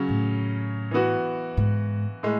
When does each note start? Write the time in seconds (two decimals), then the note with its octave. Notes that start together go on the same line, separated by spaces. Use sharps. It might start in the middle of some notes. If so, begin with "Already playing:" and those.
Already playing: C#3 F#3 C#4
0.09 A2
0.91 E3 B3 F#4
1.57 G#2
2.23 A2 G#3